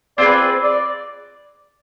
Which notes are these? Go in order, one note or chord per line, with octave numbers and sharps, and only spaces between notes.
C4 F4 G#4 B4 D5
D5